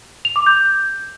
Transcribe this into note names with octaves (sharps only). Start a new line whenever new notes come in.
F7
D6
G6